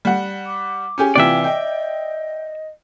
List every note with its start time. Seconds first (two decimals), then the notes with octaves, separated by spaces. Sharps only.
0.05 G3 F#5
0.46 D6
0.98 C#4 G4 G#4
1.16 C3 E3 F4 D5 E5 G5
1.44 D#5 G5